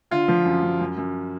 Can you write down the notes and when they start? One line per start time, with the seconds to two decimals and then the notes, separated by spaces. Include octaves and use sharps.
0.11 D3 F4
0.28 F3
0.45 F#2
0.63 F#2
0.80 F#2
0.97 F#2